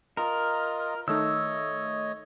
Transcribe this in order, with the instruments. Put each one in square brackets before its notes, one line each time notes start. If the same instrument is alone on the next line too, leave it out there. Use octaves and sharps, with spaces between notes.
[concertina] F4 D#5 [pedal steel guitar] A#4
[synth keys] D#3 A3 D#4 [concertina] C#5 D#5 [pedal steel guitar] E6